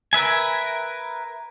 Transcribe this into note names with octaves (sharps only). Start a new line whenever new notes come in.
A#4 B4 E5 G#5